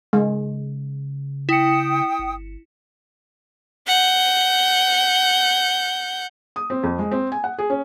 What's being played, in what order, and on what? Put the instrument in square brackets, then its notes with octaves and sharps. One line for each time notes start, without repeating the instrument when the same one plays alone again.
[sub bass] C#3 [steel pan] G#3
[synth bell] E4 C#7 [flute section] G5 D#6
[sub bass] G1
[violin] F#5 G6
[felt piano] D#6
C4
F2
G#3
C4
G#5
F#5
G#4
C#4